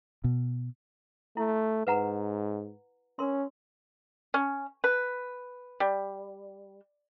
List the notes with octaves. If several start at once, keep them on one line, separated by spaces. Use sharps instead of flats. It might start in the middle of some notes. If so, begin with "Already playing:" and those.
B2
A3 E4
G#2 B4 F#5 A#5
C#4 A#4 C6
C#4
B4
G3